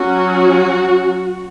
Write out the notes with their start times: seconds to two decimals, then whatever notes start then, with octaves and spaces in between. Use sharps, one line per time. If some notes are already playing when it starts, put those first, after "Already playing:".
Already playing: F#3 C#4 F#4